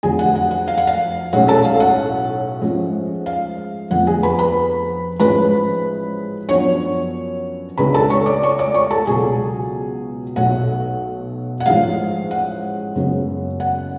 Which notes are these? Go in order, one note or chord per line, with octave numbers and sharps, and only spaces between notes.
F1 F2 D3 F#3 G#4 G#5
F#5
F#5
F#5
F5
F#5
F5
B1 A2 G#3 C#4 F#5
A4 A5
F5
F#5
G#2 F3 A3 C#4
F5
F1 F2 D3 F3 B3 F#5
G#4 G#5
B4 B5
B4 B5
A1 G#2 F3 G#3 C#4 B4 B5
F#2 F3 B3 D4 C#5 C#6
C#2 C#3 G#3 D4 B4 B5
A4 A5
C#5 C#6
D5 D6
C#5 C#6
D5 D6
C#5 C#6
A4 A5
C#2 B2 F#3 B3 G#4 G#5
B1 B2 A3 F#5
F#5
A1 G#2 F3 G#3 F5
F#5
F#1 F#2 C#3 G#3 B3
F#5